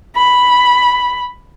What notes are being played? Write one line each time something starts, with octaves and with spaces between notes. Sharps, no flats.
B5